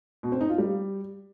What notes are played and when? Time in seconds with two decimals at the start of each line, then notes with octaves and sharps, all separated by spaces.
0.23 B2
0.32 C4
0.41 D#4
0.49 F4
0.58 G3